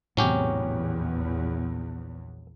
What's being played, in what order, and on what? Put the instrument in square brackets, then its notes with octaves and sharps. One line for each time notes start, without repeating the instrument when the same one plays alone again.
[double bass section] A#1 E2 [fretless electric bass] A2 C3 [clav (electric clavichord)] F#3 C#4 G4